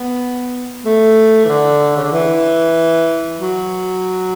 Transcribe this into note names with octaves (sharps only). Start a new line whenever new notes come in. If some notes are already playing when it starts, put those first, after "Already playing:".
Already playing: B3
A3
E3
D3
C#3
D3
E3
F#3